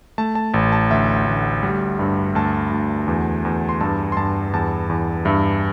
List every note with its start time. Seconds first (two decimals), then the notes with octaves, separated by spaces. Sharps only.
0.18 A3 A5
0.35 A5
0.54 A1
0.72 A5
0.90 D2 E5
1.27 D2
1.63 G3
1.99 G2
2.35 D2 A5
2.71 D2
3.08 E2
3.45 E2
3.69 C6
3.81 G2 A5
4.12 C6
4.17 G2 A5
4.53 E2 A5
4.89 E2
5.25 G2 E5